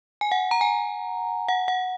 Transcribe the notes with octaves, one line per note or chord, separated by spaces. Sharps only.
G#5
F#5
A#5
G#5
F#5
F#5